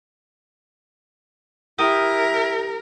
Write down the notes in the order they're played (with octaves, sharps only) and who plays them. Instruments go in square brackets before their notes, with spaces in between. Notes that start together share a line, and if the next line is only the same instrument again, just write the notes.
[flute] E4 [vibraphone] G4 [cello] A#4 [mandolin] G5 D#6